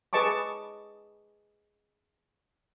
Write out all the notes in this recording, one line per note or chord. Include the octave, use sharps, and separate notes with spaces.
G#4 B4 D#5 A5 C#6 D6